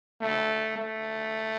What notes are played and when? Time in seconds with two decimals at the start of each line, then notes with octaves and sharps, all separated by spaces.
0.21 A3
0.77 A3